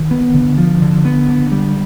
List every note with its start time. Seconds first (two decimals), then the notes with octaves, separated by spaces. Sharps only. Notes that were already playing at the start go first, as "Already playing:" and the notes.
Already playing: D#3
0.11 B3
0.34 D3
0.58 F3
0.82 D3
1.05 B3
1.29 D3
1.52 G3